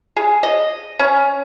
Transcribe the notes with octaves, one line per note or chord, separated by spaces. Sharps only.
G#4
D#5
C#4